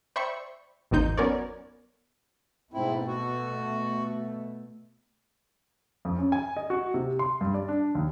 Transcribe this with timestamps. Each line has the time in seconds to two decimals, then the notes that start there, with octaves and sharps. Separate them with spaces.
0.16 C5 D5 E5 G5 B5 C#6
0.91 G#1 E2 A#3 C4 D#4 G6
1.17 F#3 B3 C#4 A#4 C#5 D5
2.74 G#2 B2 A3 C4 E4
3.08 F#4
6.05 F2
6.18 C#4
6.32 G#5
6.57 D#5
6.70 F#4
6.94 C3
7.19 C6
7.41 G2
7.54 D5
7.68 D4
7.95 D#2